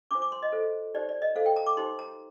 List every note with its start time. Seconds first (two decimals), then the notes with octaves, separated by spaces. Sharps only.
0.11 D4 F4 C5 D6
0.22 D6
0.32 C6
0.42 D#5
0.52 F4 A4 C5
0.94 D#4 G4 C5 D5
1.09 D5
1.22 D#5
1.35 F4 A4 C5 F5
1.46 G5
1.56 A#5
1.66 D6
1.77 D#4 G4 C5 C6
1.99 A#5